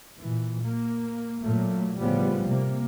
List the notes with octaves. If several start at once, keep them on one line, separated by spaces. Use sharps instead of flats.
A#2 E3
A#3
A#2 F#3 A3 A#3
A2 C#3 F3 G3 B3
C3 A#3